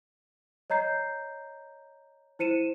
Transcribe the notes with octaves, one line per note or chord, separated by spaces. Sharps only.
C#5 D#5 A#5 G6 C7
E4 C5 C#7 D#7 E7